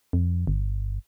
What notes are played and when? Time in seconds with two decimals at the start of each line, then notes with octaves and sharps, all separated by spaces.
0.13 F2
0.47 G1